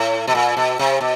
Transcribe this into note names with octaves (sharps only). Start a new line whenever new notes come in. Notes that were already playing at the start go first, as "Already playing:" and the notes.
Already playing: A2
B2
A#2
B2
C3
B2